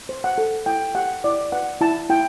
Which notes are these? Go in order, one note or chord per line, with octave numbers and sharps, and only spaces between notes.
C5
F#5
A4
E4 G5
G4 F#5
E4 D5
B4 F#5
E4 A5
E4 G5